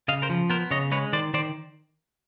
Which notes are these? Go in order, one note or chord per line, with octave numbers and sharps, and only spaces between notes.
C#3 D#5 F5
A#4 C5
F3
B3 A#4 C5
C#3 C#5 D#5
G#3 B4 C#5
D#3 C5 D5
D#3 C5 D5